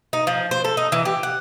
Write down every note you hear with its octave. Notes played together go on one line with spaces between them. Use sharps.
D#4
F3
C5
A4
D#4
E3
G4
F#5